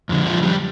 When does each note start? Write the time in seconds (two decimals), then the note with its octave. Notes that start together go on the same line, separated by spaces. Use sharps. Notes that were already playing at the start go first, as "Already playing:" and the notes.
0.09 F2 D3
0.27 F3
0.43 G3